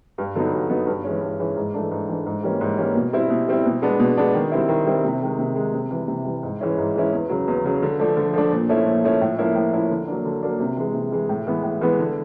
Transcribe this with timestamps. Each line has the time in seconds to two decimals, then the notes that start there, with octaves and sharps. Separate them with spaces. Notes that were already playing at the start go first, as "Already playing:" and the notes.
0.18 G2
0.35 D3 F#3 B3 D#4
0.52 G2
0.70 D3 F#3 B3 D#4
0.87 G2
1.04 E3 G#3 C#4
1.22 G2
1.40 E3 G#3 C#4
1.56 G#2
1.74 E3 A3 D4
1.91 G#2
2.09 E3 A3 D4
2.26 G#2
2.43 E3 G3 A#3 C#4
2.61 G#2
2.78 E3 G3 A#3 C#4
2.95 B2
3.13 G3 C4 E4
3.30 B2
3.48 G3 C4 E4
3.66 B2
3.82 G#3 B3 D4
4.00 B2
4.17 G#3 B3 D4
4.35 D#3
4.52 G3 C4 E4
4.69 D#3
4.86 G3 C4 E4
5.04 C3
5.21 D#3 G#3
5.39 C3
5.56 D#3 G#3
5.74 C3
5.90 E3
5.96 G3
6.08 C3
6.25 E3 G3
6.43 G#2
6.60 E3 G#3 C#4 E4
6.78 G#2
6.96 E3 G#3 C#4 E4
7.13 E2
7.29 C#3 F#3
7.48 E2
7.64 C#3 F#3
7.82 D3
8.00 F3 A3 D4
8.17 D3
8.33 F3 A3 D4
8.51 A#2
8.69 F3 A3 C#4 E4
8.86 A#2
9.04 F3 A3 C#4 E4
9.21 A2
9.39 F3 A#3 C#4 E4
9.55 A2
9.73 F3 A#3 C#4 E4
9.90 D3
10.08 F#3 A#3 D4
10.25 D3
10.43 F#3 A#3 D4
10.60 C3
10.77 E3 G#3
10.94 C3
11.12 E3 G#3
11.29 A2
11.47 E3 G#3 B3
11.63 A2
11.81 E3 G#3 B3
11.99 D3